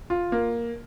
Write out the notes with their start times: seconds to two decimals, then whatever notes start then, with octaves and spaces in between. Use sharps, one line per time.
0.10 F4
0.32 A#3